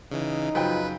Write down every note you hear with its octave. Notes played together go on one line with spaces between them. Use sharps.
C#3 E3 D#4
F#2 C#3 F3 B4 G5